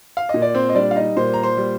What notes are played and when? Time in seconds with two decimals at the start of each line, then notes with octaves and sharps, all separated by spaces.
0.17 F5
0.29 A#2 D#5
0.42 D5
0.54 C4 C5
0.69 D#5
0.75 G3 D4 D5
0.91 F5
0.96 D#4 D#5
1.17 A#2 C5 C6
1.34 A#5
1.43 C5 C6
1.57 G3